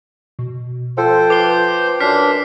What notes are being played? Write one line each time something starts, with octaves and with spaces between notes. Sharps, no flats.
B2
F3 A4 C5 G5
B4 D6 C7 G7
F#2 D4 F6 B6 C7